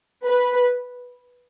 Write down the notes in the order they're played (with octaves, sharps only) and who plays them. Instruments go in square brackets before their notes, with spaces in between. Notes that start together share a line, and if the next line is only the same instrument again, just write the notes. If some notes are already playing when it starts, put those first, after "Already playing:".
[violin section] B4